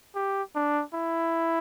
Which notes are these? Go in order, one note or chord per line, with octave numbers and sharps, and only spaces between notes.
G4
D4
E4